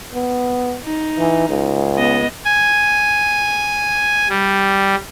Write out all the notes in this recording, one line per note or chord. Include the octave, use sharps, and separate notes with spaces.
B3
D#4
E3
C#2
B3 D#5
G#5
G3